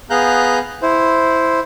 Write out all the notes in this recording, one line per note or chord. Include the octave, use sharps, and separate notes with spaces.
B3 G#4 F5 A#5 F#6 G6
E4 C5